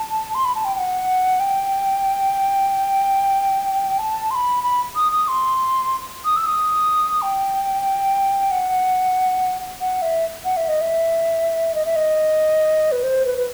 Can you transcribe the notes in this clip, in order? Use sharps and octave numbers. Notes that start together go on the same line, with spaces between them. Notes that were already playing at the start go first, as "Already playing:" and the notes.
Already playing: A5
C6
B5
A5
G5
G5
F#5
G5
A5
C6
B5
B5
D#6
D#6
C6
D#6
E6
D#6
G5
F#5
F#5
E5
F#5
E5
D#5
E5
D#5
E5
D#5
B4
C5
B4
B4